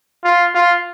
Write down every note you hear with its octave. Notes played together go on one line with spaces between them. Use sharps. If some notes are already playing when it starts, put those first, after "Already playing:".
F4
F4